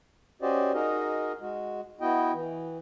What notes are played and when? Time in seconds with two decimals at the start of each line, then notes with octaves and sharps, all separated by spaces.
0.42 C#4 F#4 G4 C5 D5 D#5
0.74 D#4 F#4 G#4 A#4 D#5
1.41 G#3 F#4
2.01 B3 E4 F#4 D#5 G5
2.34 E3